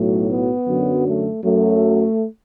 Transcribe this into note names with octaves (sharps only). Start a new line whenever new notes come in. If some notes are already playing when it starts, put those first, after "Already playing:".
Already playing: B1 A2 F#3 A3
B3
F#2 D3 F#3
A3
F#2 F#3 A3